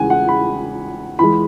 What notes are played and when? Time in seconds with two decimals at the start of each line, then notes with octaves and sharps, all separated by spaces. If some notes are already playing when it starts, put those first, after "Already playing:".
Already playing: E2 C#3 G#3 F#5 G#5
0.10 F#5
0.28 B5
1.19 E2 E3 G#3 B5